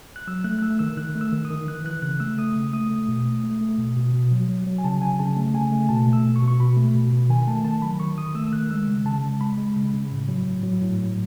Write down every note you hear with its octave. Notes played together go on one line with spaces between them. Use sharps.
F#6
F#3 E6
A3 F#6
F#6
A3 E6
D#3 E6
D#3 F#6
A3
E6
D#3
D#6
D#3
E3 F#6
E3 F#6
C#3 F#6
A3 E6
A3 D#6
C#3
A3 D#6
A3
B2
A3
A3
A3
B2
B2
B2
F#3
F#3
F#3
G#5
C#3 A5
F#3 G#5
C#3 A5
A3
C#3 G#5
A3
B2 A5
A3
E6
B2
C#6
B2
C#6
B2 B5
A3
B2
B2
D#3 G#5
A3 A5
D#3 A5
F#3 B5
D#3 C#6
D#3 D#6
A3 E6
E6
D#3 F#6
G#3 E6
C#3
C#3 A5
G#3
G#3 B5
G#3
C#3
C#3
A2
F#3
A2
F#3
A2
F#3